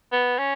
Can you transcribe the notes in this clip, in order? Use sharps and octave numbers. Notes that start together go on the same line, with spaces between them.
B3
C#4